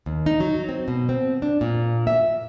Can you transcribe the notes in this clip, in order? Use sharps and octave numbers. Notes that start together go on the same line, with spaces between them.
D#2
D#4
F#3
C4
B2
C4
D4
A#2
E5